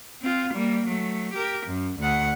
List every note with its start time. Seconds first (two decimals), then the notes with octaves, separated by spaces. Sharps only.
0.22 C4 F4
0.54 G3 A#3
0.87 F#3 A3
1.34 G4 A#4
1.66 F#2
2.00 D2 F#5